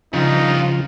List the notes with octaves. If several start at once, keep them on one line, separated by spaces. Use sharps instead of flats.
G2 C#3 F3 D#4 F4